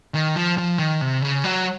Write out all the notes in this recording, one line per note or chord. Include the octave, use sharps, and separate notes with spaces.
D#3
F3
F3
D#3
C3
C#3
F#3